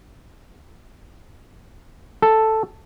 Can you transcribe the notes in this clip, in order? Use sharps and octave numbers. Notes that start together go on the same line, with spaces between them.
A4